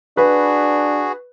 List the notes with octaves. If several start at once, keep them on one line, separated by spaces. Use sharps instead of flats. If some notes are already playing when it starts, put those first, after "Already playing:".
D4 F#4 G#4 B4